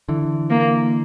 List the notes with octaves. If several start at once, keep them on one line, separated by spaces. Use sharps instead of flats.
D3 E3
A#3